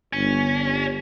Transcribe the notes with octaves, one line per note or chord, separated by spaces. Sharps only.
G1 C#4